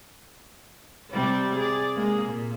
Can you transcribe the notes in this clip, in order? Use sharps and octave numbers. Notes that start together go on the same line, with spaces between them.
C3 G3 D5
G#4 D5
G#3 A#3 G#4
A#2